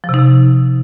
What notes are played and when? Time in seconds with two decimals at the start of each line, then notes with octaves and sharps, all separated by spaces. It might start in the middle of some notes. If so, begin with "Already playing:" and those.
0.04 F3
0.09 C3
0.14 D#4
0.19 C3